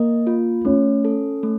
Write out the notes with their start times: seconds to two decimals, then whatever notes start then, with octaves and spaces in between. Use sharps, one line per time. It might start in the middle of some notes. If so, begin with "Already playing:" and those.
Already playing: A#3 D#5
0.27 F4
0.65 A3 C#4
1.05 A4
1.43 A3